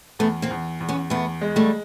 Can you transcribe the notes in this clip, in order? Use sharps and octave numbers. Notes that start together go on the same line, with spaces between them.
E2 A3 B3
A#3 C4
E2
E2
B3 C#4
E2 A3 B3
G#3
G3 A3